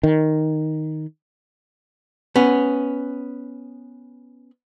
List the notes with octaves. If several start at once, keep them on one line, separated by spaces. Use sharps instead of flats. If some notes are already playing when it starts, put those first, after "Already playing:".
D#3
B3 C#4